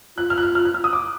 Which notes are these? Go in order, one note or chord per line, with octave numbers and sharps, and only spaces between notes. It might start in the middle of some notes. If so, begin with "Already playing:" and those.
F4 F#6
F6
F#6
F6
F6
F#6
F6
D#6
D6